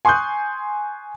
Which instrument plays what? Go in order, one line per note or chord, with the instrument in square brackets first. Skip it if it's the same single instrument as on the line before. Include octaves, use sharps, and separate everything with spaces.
[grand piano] G#5 C6 C#6 D#6 F#6 G6